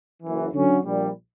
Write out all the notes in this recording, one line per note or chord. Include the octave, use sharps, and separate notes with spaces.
F#1 F#2 E3
D3 F#3 C#4
A#1 A#2 G3